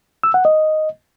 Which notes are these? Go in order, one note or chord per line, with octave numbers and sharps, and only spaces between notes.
E6
F#5
D#5